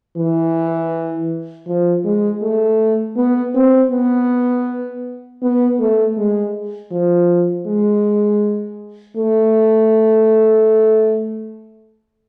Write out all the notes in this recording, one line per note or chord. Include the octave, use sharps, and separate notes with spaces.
E3
F3
G#3
A3
B3
C4
B3
B3
A3
G#3
F3
G#3
A3